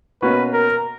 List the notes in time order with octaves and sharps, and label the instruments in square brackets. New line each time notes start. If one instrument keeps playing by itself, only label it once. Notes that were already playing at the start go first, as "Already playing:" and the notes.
[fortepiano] B2 A#3 C#4 F#4 [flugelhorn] B4
[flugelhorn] A#4